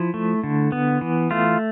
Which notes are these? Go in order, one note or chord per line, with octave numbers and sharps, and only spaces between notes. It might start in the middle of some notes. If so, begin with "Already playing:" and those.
Already playing: F3 E4
A3
D3
B3
E3
A3 F4